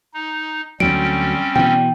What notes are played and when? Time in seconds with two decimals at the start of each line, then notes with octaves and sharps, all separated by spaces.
0.14 D#4
0.80 D2 F#3 G3 C4 C#4 D7
1.56 B2 E3 G5